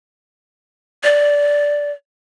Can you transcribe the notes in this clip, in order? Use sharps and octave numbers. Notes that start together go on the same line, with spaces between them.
D5